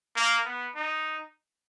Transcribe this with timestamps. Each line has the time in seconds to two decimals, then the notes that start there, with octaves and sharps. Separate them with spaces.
0.16 A#3
0.45 B3
0.76 D#4